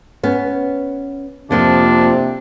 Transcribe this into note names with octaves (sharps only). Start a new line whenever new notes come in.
B3 C#4
F2 C3 F3 A#3 D4